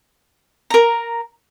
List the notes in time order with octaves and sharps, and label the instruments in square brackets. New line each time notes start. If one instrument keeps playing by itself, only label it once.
[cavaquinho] A#4 A#5